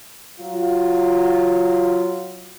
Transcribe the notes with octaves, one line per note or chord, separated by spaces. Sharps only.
F#3 F4